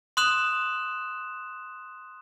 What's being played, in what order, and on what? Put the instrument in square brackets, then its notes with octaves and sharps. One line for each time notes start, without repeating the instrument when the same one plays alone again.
[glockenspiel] C6 D#6 F#6 E7 F7